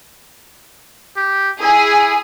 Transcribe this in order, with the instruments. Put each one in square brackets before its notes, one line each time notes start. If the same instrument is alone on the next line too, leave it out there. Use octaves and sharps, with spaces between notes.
[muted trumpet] G4
[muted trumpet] E4 [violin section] G#4